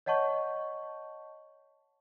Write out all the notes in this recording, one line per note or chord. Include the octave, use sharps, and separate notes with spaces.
C#5 D#5 F#5 A5 C#6 G6